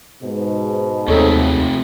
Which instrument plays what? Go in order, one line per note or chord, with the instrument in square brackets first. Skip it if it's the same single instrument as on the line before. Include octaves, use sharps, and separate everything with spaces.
[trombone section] G#2 B2
[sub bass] D#2 [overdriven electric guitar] C3 A3 [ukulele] D#4 A4 C#5